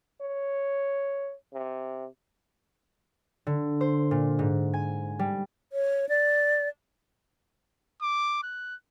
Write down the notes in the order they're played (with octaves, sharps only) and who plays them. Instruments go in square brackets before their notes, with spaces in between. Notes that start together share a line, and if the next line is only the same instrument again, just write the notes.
[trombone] C#5
C3
[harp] D3
C5
A#2
G#2
G#5
G3
[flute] C#5
D5
[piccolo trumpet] D6
F#6